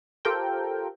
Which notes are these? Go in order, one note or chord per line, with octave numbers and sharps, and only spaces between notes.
F4 G4 A4 A#4 C5 G5